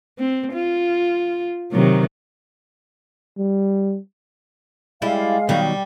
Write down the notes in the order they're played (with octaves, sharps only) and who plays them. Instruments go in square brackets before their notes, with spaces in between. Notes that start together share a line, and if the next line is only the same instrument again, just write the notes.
[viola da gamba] C4
F4
C3 D#3 F#3
[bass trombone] G3
[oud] G3 E4 [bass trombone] G#3 [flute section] F5
[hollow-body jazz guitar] B2 D#3 F#3 [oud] G3